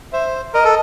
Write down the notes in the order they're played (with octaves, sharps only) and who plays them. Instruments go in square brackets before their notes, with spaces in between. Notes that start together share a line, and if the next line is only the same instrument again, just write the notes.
[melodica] C5 [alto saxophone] E5
[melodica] A#4 [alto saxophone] D#5
[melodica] A4